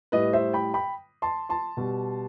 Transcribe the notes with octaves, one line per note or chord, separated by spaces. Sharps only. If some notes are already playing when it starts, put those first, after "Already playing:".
A2 G3 B4 D#5
C5 E5
G5 B5
G5 B5
A5 C6
A5 C6
B2 G3